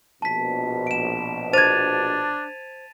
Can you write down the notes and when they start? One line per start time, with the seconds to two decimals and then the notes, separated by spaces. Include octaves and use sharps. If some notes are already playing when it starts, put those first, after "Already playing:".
0.22 A#1 B2 A5 B6
0.87 D7 E7
1.53 D4 C5 G#6 A6 D#7 F7